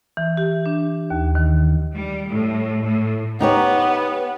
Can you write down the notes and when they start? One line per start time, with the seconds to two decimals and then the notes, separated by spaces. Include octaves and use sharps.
0.17 E3
0.37 G4
0.66 D4
1.10 D#2
1.35 D#3
1.94 G3
2.31 A2
2.83 A2
3.41 B3 D#4 G4 C#5